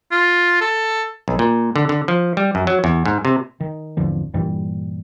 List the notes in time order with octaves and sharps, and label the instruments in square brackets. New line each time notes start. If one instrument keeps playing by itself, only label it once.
[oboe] F4
A4
[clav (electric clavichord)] B1
A#2
D3
D3
F3
G3
F#2
F#3
E2
G#2
C3
[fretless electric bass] D#3
G#1 E2 D3 F3
G2 A#2 E3 G3